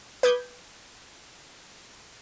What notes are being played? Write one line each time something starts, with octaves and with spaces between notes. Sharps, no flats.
B4 D6 D#6 G6 G#6